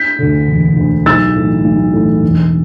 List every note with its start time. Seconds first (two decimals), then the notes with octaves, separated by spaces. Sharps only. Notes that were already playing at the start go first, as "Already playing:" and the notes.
Already playing: G6 B6
0.19 D2 D3
0.47 E1
0.77 D2 D3
1.06 B1 E6 A6
1.35 A2 E3
1.64 B1
1.93 A2 E3
2.23 E1